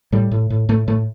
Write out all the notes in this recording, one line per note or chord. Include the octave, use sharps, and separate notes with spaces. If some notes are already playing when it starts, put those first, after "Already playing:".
A2 G3
A2
A2
A2 A3
A2 A3